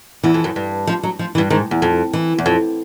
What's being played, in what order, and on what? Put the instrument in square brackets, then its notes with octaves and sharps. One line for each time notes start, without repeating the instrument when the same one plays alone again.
[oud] E2 [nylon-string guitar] E3
[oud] F2
F#2
G2
[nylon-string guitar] F3
F#3
F3
E3
[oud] G2
[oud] G#2 [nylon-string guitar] D#3
[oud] E2
F2
[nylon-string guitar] E3
[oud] E2
F2